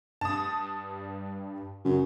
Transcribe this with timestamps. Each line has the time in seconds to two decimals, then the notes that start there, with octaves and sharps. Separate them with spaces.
0.21 G2 A5 D#6
1.85 F#2 C#3